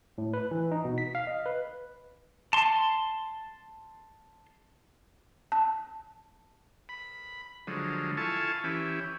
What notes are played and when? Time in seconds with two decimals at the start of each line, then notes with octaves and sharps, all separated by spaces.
0.18 A2
0.33 B4
0.51 E3
0.71 D#4
0.85 B2
0.98 B6
1.15 F5
1.27 D#5
1.46 B4
2.53 A5 C6
5.52 A5
6.89 B5
7.67 D3 F3 F#3 G#3
8.17 E4 F4 A4 G#5 A5 C#6
8.64 E3 C#4 E4 G4